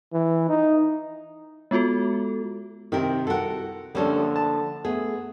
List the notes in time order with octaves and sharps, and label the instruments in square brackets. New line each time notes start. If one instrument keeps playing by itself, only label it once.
[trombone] E3
D#4
[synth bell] G#3 B3 F4 F#4 A4
[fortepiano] C3 D#3 [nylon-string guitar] C4 G4 A#4
[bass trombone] C2 [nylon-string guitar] F#4 A#4 [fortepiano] A4 F#5
[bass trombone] D3 [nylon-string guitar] F3 A#3 D4 [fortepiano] G3 C#4 A4
[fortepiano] A5
[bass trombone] A3 [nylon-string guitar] B3 [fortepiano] G#4